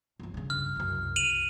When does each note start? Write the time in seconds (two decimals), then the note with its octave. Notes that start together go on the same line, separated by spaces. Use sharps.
0.20 G1 F3
0.34 G2 C#3
0.50 F6
0.76 C2 F#2
1.16 D#7 F7 F#7